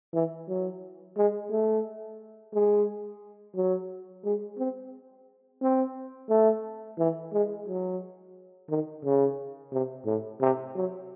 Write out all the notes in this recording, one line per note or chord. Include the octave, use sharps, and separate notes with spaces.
E3
F#3
G#3
A3
G#3
F#3
G#3
C4
C4
A3
E3
G#3
F#3
D#3
C#3
C3
A2
C3
F#3